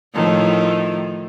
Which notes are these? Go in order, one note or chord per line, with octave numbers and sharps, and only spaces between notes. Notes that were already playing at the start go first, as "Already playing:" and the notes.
A2 D#3 F3